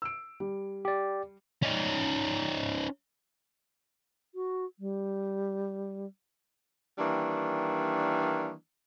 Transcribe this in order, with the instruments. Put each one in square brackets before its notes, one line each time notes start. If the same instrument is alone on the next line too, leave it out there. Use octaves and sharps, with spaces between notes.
[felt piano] E6 D7
G3
[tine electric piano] G4 D5
[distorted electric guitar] C#4 D#4
[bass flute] F#4
G3
[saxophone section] D#3 E3 G3 A#3 D4